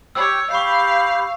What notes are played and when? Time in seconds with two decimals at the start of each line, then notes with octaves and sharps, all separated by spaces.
0.15 G4 C#5 E6
0.51 G4 F5 B5 C#6 G6 C7